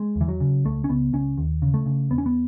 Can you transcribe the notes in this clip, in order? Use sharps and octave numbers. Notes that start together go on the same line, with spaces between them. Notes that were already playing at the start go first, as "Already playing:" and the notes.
Already playing: G#3
E2
E3
F#3
C#3
C#2 A3
C#4
C#2 B3
C#2 C#4
D#2
C#3
A3
C#3
E2 B3
C#4
B3